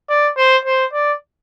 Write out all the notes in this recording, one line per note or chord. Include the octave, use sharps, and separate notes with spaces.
D5
C5
C5
D5